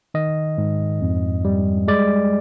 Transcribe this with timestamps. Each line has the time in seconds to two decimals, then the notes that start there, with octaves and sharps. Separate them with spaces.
0.14 D#3 D#5
0.58 G#2
1.01 F2
1.45 G3
1.88 G#3 D5